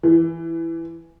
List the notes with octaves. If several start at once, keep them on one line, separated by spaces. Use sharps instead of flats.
E3